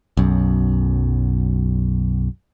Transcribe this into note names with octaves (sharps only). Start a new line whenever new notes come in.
B1 F#2